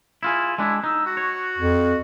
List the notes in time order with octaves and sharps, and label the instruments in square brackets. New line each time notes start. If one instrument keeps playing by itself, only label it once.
[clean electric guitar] E4 F4 G#4
[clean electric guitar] G#3 D4 [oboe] E4
[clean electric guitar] D#4 [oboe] E6
[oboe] F#4
[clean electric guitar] C#5
[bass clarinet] F2